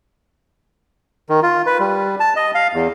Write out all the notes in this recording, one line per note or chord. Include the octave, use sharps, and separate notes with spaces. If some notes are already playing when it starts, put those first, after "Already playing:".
D#3
F4
B4
G3
A5
D#5
F5
E2